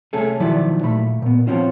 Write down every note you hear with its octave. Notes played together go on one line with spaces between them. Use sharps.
C2 A3 C#4 G#4 A4
B1 D#3 F3 F#3 E4 D5
A#2 A3 B5
A#2 B3
F3 A3 C4 C#4 F4 F#4